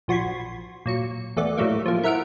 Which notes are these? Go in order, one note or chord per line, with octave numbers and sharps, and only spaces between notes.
A#1 F3 F#4 B5 C6 G#6
A#2 F#3 C#7
E2 A3 B3 D5
A2 F#3 G3 A3 A#3
F3 A#3
E4 A#4 E5 F#5 F6 D7